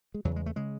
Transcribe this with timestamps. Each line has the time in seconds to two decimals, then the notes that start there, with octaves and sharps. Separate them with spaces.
0.14 G#3
0.25 E2 C#3 F#3
0.36 G#3
0.46 A3
0.56 C#3 G#3